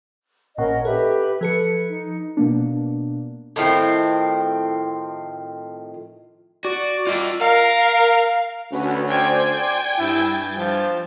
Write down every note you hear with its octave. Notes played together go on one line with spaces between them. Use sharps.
A1 A#2 C#4 A#4 D#5 F#5
G4 A4 B4 E5
F3 A4 B4 C#7
D#4
B2 A#3 D4
A2 D#3 F3 C4
F#4 D5
F4 D#5
A#4 F5
D2 C#4 F#4 B4
C5 D5 G5 G#5 G#6
G2 E4 G6 A6
F3